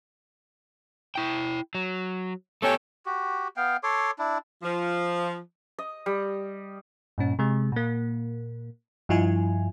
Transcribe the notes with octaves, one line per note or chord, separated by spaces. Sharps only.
E4 G5
F#3
A3 B3 G4 A4 C#5 G#5
F#4 G4
B3 F5 G5
A4 C#5 C6 D6
D4 E4
F3
D#5
G3
G2 A#2 C#4
C3 G#3
A#2 A#3
G2 F3 E4 F4 G#5